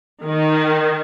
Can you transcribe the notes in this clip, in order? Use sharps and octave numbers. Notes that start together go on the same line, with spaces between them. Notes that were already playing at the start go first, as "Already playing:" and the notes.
D#3